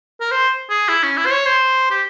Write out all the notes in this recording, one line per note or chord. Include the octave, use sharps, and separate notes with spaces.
A#4
C5
G#4
E4
C#4
E4
C5
C#5
C5
G4